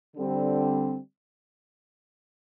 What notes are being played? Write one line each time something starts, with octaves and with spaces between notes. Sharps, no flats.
D3 G3 C4